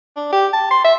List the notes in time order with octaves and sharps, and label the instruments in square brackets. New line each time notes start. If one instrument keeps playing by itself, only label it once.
[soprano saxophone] D4
G4
A5
C6
E5